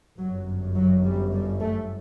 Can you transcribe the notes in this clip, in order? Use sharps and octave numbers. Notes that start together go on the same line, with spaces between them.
G1 F#2 F#3
F#3
G3
G3
A3